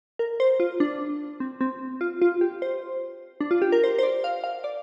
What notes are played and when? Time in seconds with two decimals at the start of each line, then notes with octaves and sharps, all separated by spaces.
0.19 A#4
0.40 C5
0.60 F4
0.80 D4
1.40 C4
1.61 C4
2.01 F4
2.22 F4
2.41 G4
2.62 C5
3.41 D4
3.51 F4
3.62 G4
3.72 A#4
3.84 C5
3.98 C5
4.03 D5
4.24 F5
4.44 F5
4.64 D5